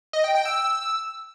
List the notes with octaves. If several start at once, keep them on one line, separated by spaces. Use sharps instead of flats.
D#5
G5
G5
E6